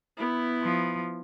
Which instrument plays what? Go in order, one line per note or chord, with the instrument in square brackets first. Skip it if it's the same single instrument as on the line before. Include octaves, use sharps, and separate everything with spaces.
[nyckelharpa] B3 E4
[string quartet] F3